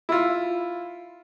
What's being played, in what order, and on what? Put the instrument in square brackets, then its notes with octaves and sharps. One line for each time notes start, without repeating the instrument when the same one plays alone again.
[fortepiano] E4 F4